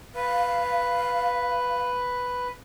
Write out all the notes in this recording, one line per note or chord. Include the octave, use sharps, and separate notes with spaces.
B4 F5